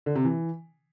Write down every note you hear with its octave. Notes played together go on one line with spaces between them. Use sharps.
D3
C3
E3